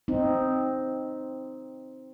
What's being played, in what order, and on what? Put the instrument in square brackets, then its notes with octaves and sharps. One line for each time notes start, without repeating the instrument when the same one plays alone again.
[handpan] C4 D#4